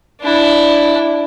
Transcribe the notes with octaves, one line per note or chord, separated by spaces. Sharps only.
D4 E4